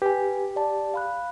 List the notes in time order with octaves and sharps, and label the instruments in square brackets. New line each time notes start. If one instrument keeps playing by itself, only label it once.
[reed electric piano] G4 [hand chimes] B4 G#5
[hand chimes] D5 A5
F5 B5 F#6